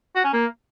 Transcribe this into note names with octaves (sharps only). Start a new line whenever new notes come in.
F#4
C#4
A#3